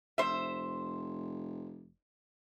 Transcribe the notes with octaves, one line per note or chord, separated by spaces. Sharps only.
F1 C5 E5